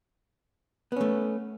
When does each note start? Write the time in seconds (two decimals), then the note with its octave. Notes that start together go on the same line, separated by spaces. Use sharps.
0.92 B3
0.96 C#4
1.01 A3